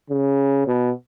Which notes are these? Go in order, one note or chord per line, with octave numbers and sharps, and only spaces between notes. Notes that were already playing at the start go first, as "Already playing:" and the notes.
C#3
B2